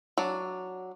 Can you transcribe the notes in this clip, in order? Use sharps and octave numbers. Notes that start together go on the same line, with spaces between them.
F#3 D4